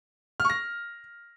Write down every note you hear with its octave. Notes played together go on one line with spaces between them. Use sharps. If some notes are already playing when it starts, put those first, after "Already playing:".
F6
C#6
A#6